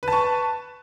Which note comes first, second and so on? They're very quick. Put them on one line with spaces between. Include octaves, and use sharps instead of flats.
B4 A5 C#6